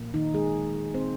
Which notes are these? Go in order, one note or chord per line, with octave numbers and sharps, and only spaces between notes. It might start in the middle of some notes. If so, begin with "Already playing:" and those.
Already playing: A#2 F3 A#3
D#3 D#4
G#3 G#4
C4 C5